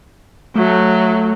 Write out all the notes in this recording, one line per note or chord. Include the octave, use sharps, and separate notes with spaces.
F#3 A3